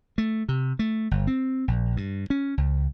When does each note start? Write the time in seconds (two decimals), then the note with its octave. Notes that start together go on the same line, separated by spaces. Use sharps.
0.18 A3
0.49 C3
0.79 A3
1.11 G1
1.27 C4
1.68 A#1
1.97 G2
2.30 C#4
2.57 C#2